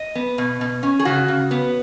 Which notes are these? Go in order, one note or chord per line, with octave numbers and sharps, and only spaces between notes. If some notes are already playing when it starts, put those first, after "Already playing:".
Already playing: D#5
B3
B2
B2
C#4
G#4
C#3 F#4
C#3
B3